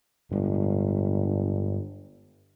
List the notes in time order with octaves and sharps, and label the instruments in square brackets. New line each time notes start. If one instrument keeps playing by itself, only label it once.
[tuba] G1 [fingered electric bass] G2 G3 G#3